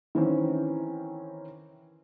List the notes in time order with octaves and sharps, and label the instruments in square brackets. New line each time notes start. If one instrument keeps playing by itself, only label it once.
[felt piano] D#3 E3 C4 C#4